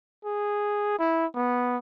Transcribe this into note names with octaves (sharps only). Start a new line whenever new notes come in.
G#4
E4
B3